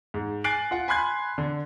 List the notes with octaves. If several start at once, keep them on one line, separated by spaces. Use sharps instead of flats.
G#2
G#5 F#6 A6 C7 D7 F#7
F4 F#5
G#5 B5 C6 F#6 G#6
D3